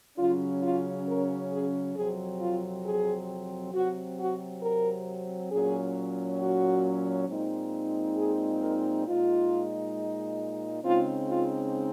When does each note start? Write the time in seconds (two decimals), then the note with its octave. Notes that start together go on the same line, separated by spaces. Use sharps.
0.18 C#3 F#3 C#4 F4
0.62 F4
1.08 A#4
1.52 G#4
1.95 F2 C3 F#3 C4 G#4
2.41 F4
2.85 G#4
3.73 C3 F#3 C4 F#4
4.19 F#4
4.62 A#4
5.51 A#2 F#3 C#4 G#4
6.40 F#4
7.29 A#2 G#3 C4 D#4
8.17 G#4
8.62 A#4
9.07 A#2 G#3 D#4 F4
10.84 C#3 G#3 C4 D#4 F4
11.29 F4